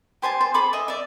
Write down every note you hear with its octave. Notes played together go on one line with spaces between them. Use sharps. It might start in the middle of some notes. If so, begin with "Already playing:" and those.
G4 C5 G#5 A5
C5
G#4 A4 B5 D6
D#5 E5
D5 E5